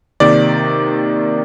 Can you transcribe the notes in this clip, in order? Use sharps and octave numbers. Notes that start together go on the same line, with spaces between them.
C3 D#3 A#3 D5